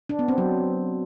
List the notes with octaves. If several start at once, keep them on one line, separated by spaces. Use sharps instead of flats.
D4
B3
C4
F#3